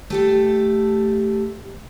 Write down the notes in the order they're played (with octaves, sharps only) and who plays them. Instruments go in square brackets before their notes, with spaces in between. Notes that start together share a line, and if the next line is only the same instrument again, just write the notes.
[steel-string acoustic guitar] A3 G4 A4